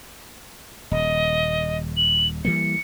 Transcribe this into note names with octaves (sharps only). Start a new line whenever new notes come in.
D#1 D#5
F#7
E3 G3 A#3 C#7